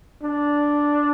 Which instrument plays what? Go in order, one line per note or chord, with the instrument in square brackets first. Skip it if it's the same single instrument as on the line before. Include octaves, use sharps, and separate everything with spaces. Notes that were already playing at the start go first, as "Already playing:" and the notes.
[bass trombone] D4